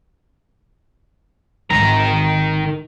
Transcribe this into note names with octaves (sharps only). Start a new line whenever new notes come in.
D1 G#1 D#3 A#5